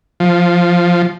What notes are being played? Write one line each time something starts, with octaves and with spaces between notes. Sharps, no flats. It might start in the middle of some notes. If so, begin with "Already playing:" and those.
F3